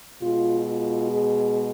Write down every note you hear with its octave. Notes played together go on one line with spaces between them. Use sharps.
B2 G#3 F4
F4
G#4